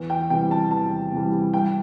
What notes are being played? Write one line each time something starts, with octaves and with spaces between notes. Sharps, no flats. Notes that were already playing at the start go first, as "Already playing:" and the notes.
Already playing: E2
G5
C3 E3 G3 G5
A5
E2 A5
C3 E3 G3
G2 G5